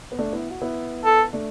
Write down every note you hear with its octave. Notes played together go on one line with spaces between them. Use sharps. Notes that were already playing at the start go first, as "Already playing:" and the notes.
B3
A3 D4
B3 E4
F#4
B3 E4
A4
A3 D4